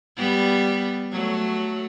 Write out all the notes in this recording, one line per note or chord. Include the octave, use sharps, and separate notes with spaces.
G3 B3
F#3 A3